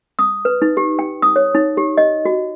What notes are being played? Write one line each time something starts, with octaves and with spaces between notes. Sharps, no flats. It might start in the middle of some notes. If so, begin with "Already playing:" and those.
D#6
B4
D#4
G4
G5
D#6
C#5
D#4
G4
D#5
F#4